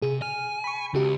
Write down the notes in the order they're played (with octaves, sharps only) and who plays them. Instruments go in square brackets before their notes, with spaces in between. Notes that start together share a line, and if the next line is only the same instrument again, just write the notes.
[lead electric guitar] C3 [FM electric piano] G#4
[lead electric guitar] G#5 [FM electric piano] F6
[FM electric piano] B5 C#6
[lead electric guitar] C#2 [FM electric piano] C#3 F#4 G4